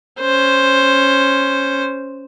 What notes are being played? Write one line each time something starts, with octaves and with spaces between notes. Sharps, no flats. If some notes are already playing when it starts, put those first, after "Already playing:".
C#4 C5